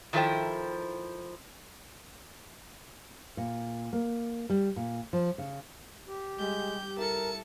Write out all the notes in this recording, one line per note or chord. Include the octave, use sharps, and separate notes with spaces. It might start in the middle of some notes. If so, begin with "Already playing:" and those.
D#3 F3 E4 A4 C5 G5
A#2
A#3
G3
A#2
F3
C#3
G4
G3 G#3 G6
E4 A4 A#4 A5 C#7